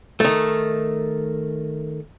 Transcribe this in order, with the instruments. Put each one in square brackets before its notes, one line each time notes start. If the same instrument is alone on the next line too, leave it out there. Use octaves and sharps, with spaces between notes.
[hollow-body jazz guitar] D#3 A3